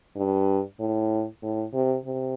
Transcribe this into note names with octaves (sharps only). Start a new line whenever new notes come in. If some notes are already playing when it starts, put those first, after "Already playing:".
G2
A2
A2
C3
C3